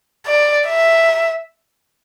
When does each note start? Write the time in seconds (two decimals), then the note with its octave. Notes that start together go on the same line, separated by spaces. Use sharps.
0.27 D5
0.68 E5